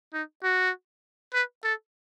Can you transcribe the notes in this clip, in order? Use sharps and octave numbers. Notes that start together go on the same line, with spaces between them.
D#4
F#4
B4
A4